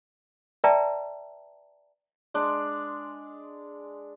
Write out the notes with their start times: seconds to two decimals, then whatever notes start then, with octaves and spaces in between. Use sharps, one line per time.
0.64 B4 D5 E5 G5 A5 A#5
2.34 G#3 D4 D5